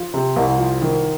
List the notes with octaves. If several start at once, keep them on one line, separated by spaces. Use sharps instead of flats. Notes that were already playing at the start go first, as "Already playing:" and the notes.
Already playing: F3
C3
C2
F3
D#3